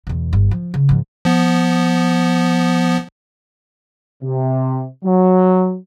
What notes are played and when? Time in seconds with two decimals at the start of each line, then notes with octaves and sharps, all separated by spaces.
0.07 E2 B2
0.33 G1
0.51 F3
0.74 C#3
0.89 G#2 F3
1.25 F3 B3
4.23 C3
5.04 F#3